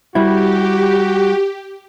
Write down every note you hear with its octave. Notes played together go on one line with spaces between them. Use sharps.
G3 E4 F#4 G4